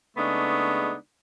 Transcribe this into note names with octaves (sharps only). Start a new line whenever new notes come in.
C#3 G#3 A3 B3 D4 D#4